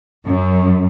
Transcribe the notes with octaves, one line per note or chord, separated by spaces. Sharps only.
F#2